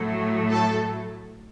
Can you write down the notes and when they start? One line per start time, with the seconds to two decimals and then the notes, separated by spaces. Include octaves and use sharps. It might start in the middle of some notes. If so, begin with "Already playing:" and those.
Already playing: A2 F#3 A3
0.50 A4